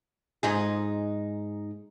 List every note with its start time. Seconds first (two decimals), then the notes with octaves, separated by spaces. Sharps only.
0.43 G#2 D#4 G#4